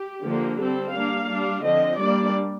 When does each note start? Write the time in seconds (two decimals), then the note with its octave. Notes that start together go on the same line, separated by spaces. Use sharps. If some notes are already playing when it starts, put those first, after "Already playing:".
Already playing: G4
0.24 D3 F3 A#3
0.59 G3 C4 A4
0.94 G3 A#3 D4 F5
1.28 G3 D4
1.63 D3 F3 C4 D#5
1.99 G3 A#3 D4 D5